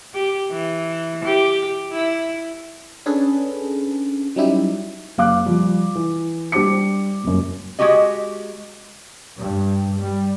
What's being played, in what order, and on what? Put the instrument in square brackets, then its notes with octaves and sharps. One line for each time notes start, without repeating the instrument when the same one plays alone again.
[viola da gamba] G4
E3
G4
E4
[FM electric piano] C#4 D4 G#4 A4 B4
F#3 G3 C#4 D#4 E4 G4
[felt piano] F#1 F5 D6 F#6
F3 G3
E3
G3 D4 G4 C5 D6 C#7
D#1 F#2
[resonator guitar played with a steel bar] G#3 D#4 F#4 G4 D#5
[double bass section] G2
G3